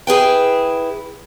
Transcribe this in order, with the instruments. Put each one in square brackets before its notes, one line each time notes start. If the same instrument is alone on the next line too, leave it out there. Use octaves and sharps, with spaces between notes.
[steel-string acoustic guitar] E4 G#4 B4 G5